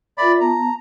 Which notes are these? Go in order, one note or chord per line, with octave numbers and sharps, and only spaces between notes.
F4 A#4 D5 E5 B5
B3 A5 A#5